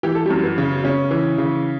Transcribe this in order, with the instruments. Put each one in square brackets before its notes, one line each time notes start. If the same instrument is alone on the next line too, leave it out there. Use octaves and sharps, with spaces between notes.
[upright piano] E3 G4
A4
F#2 G3 G4
B3
C#3
C#3 C#4
E3
C#3